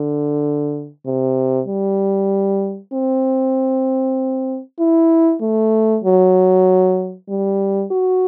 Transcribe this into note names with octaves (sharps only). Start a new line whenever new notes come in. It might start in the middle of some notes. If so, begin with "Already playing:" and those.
Already playing: D3
C3
G3
C4
E4
A3
F#3
G3
F#4